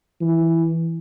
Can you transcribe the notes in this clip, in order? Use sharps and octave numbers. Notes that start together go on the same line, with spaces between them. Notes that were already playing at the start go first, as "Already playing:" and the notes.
E3